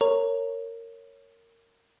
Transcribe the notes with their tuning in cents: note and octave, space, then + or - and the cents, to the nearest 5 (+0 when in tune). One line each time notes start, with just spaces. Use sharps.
A#4 -20 C#5 +0